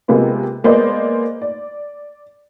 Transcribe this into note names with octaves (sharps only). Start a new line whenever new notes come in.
C3 G#3 A#3 B3 F4
G#3 A#3 B3 C5 D5 D#5
D5